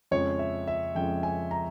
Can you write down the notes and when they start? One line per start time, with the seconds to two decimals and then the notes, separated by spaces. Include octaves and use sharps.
0.11 F2 C#3 F3 G#3 C#5
0.39 E5
0.68 E5
0.95 F2 C#3 F3 G#3 G5
1.23 G#5
1.51 A#5